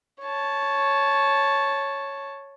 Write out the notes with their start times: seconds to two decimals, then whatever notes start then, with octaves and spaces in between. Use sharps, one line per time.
0.21 C#5 A5